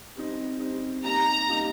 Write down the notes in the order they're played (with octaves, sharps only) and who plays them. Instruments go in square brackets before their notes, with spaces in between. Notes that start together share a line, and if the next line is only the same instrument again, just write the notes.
[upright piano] G3 C4 D#4
G3 C4 D#4
[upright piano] G3 A#3 D#4 G4 [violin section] A#5
[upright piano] G3 A#3 D#4 G4